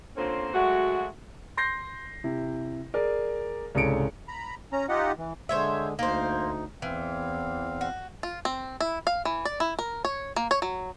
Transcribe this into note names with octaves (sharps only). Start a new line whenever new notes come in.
D3 A#3 C4 C#4 F4 C5
F#3 G#3 A3 F#4
C6 G6 A#6 C7
C3 E4
G#4 A#4 D5
C2 G#2 C#3 A4 C#7 D7
A#5 B5
C#4 A#5
D#4 F4 G4 D#5 F#5
E3
D3 G#3 C5 C#5 E5
D2 A#3 D#4 C5
E2 E3 C4 F5
F#4
F4
C4
E4
F5
E3
D5
E4
A#4
C#5
A#3
C#5
F#3